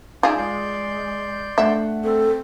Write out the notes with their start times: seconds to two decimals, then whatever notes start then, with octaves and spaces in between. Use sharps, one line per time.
0.23 D#4 F4 G#4 D5 E5 G6
0.38 G#3 D5 C6 G6
1.58 A3 D4 E5 F#5
2.04 C4 A4